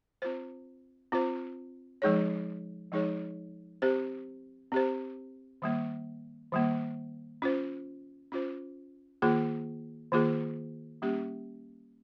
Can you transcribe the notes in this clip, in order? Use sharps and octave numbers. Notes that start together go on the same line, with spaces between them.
C4 F4 C5
C4 F4 C5
F3 G#3 D#4 G#4 C#5
F3 G#3 D#4 G#4 C#5
C4 G4 C5
C4 G4 C5
D#3 G3 A#3
D#3 G3 A#3
C#4 F4 C5
C#4 F4 C5
D#3 A#3 F4 G#4
D#3 A#3 F4 G#4
G3 A#3 C#4 G4